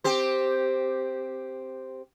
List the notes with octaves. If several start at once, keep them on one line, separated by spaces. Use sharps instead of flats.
C4 G4 C5